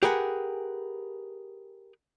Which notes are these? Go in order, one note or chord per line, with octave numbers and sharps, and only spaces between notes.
G4 G#4 A#4 B4 F#5 G#5